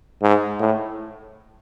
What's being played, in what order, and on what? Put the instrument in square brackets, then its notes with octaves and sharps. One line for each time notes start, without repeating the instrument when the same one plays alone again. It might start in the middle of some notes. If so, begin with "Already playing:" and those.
[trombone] G#2
A2